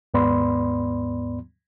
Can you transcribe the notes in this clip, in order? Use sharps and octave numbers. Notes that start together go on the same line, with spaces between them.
D#2 G#2 B3 D5 B5 C6